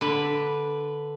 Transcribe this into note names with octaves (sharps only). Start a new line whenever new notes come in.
D3 B4